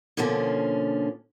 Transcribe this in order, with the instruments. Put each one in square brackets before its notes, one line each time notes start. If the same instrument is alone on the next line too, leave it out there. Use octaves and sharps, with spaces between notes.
[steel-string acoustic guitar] B2 D3 F3 A#3 C#4